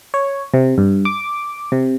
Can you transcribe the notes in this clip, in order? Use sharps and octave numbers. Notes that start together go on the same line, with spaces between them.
C#5
C3
G2
D6
C3